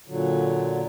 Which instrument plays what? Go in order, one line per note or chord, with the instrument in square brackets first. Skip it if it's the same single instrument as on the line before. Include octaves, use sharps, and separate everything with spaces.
[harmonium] A#2 D3 F#3